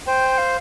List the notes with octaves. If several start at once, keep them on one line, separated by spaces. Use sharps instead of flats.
C5 G5
F5